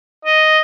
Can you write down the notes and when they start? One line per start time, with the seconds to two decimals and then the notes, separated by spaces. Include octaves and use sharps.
0.25 D#5